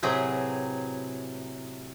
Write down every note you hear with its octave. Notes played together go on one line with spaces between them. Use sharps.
A2 C3 F#3 G#4 B4